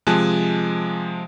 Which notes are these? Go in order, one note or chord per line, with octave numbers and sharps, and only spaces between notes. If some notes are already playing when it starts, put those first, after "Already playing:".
C3 F3 G#3 G#5 A5 F#6